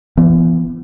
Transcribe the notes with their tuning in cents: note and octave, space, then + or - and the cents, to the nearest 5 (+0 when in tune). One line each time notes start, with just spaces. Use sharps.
E3 +40 B3 +0